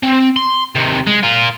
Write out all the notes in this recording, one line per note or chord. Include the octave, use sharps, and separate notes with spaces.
C4
C6
C3 D#3
G#3
F4 A#4